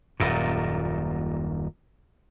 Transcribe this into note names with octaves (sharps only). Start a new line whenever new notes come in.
D#1 F#2 A#2